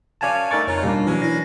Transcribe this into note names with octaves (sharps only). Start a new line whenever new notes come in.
F#2 C#4 D5 F5 G#5 A5
G2 A3 D#4 A#4 D5 C#6
F2 C#3 F4 C#5 A#5
B2 G3 A#3 D4
E3 F#3 A#3 C#4 D4
E4 D5 A#6